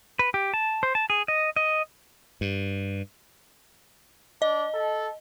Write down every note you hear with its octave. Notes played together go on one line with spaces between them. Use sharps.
B4
G4
A5
C5
A5
G#4
D#5
D#5
G2
D4 D#5
A4